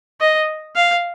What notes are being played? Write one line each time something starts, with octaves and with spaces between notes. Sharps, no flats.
D#5
F5